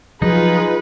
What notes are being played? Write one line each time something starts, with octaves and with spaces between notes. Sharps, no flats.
F3 F#3 D#4 F4 G#4 B4